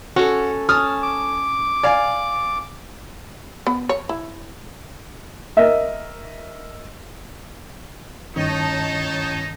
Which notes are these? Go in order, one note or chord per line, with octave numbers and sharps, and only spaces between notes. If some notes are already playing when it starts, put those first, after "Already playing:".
C#4 F#4 A4
C#4 A5 D#6 F6
D6
D5 F5 G#5
B3
C#5
E4
A#4 D#5 E5
G2 D#3 A3 C#4 D#4 C#5 D#5 A5